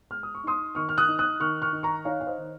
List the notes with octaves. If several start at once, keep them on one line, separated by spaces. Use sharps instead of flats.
G#3 F6
D#6
C#6
D#4 C6 D#6
D#3 C#6 F6
F6
D#6 F#6
D#4
D#6 F#6
D#3 C#6 F6
C#6 F6
D#3
A#5 C#6
D#4 C#5 F5
F5
C5 D#5
D#3